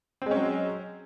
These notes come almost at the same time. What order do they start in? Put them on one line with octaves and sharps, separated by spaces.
C4 G#3 C#4 F#3